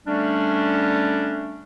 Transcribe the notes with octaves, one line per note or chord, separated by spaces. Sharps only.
D3 G3 A3 C#4 D4